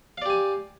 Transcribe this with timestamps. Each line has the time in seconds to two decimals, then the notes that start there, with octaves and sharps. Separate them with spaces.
0.18 F5
0.22 D5
0.26 G4
0.30 G#5